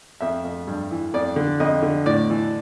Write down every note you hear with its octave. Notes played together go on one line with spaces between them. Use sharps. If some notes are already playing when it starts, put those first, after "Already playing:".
F2 E5
F2
G2
E3
F2 D5
D3
F2 D#5
D3
A2 D5
E3